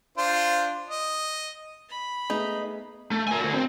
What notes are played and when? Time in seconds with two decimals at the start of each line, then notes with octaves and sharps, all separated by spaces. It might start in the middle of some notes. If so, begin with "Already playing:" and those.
0.17 D4 F4 C5
0.90 D#5
1.89 B5
2.30 A3 B3 D#4 G#4
3.11 A3
3.28 A#4 G#5
3.40 A3 F#4
3.54 C4